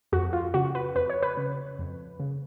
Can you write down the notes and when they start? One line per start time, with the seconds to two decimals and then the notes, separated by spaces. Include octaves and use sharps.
0.12 F2 F#4
0.33 F4
0.54 C#3 F#4
0.75 B4
0.95 F2 B4
1.10 C#5
1.23 B4
1.37 C#3
1.79 F2
2.20 C#3